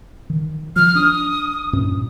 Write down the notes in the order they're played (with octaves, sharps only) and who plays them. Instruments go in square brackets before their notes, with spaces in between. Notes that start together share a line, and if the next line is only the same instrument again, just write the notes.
[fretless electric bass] D#3
[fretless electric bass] F3 [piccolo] F6
[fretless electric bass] D4 [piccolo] D#6
[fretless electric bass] G2 A#2 C#4